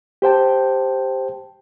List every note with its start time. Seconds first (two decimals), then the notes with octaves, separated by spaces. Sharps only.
0.22 G4 C5 G5 A5